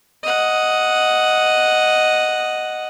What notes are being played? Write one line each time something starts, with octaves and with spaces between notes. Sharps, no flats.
D#5 F#5